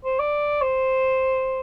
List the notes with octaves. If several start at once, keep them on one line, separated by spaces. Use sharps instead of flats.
C5
D5
C5